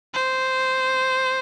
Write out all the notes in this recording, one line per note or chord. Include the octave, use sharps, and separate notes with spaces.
C5